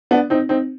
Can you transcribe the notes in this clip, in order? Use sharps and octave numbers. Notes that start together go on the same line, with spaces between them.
B3 D4
C4 D#4
C4 D#4